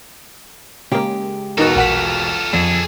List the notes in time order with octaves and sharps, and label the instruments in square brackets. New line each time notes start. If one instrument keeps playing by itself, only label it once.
[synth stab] C#3 A#3 [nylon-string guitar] G#3 G4
[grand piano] E1 F#4 [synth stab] B3 D#4 A#4 [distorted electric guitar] F4 A4
[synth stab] A#1 F#5 B6 [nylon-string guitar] A#4
[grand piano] F2 [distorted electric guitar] G#4 A4